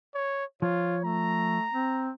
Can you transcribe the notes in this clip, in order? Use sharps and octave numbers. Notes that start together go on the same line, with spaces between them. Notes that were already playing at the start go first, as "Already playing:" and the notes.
C#5
F3 F4 C#5
A3 A#5
C4